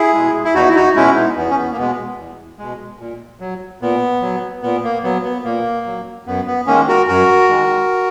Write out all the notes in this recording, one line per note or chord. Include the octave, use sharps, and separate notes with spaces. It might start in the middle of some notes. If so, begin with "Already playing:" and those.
Already playing: E4 G#4
B2 G#3
E4
E2 D#4 F#4
E4
D#4 F#4
B2 G#3 C#4 E4
B3 D#4
E2 B3
C#4
B3
A#3
B2 G#3 B3
E2
B2 G#3
A#2
F#3
A#2 B3
F#3
A#2 B3
A#3
F#3 B3
B3
A#2 A#3
F#3
F#2 B3
B3
D#3 G#3 A#3 C#4
F#4 A#4
F#2 F#4 A#4
D#3 G#3